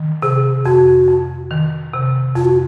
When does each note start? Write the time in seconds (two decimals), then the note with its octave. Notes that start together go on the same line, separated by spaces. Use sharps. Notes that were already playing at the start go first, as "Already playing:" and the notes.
Already playing: D#3
0.22 C3 G#4
0.65 F2 F#4
1.08 F2
1.51 D#3
1.93 C3
2.36 F2 F4
2.45 F#4